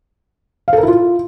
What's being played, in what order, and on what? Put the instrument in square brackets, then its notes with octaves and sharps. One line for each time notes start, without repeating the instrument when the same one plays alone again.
[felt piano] F5
A4
A#4
E4
F4